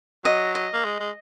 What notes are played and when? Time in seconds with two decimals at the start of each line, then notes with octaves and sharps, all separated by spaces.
0.25 F#3 D#5
0.55 D#5
0.74 A#3
0.84 G#3
1.00 G#3